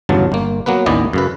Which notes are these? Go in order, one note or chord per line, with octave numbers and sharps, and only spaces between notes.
G1 E2 G2 C#3 F#3 A5
G1 A#3
F#3 A#3 B3 B4
A1 D#2 E3 B3 D5 D#5
F#2 C#3 B4